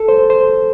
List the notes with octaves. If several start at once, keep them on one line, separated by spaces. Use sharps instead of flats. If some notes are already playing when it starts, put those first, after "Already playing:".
Already playing: A4
C5
C5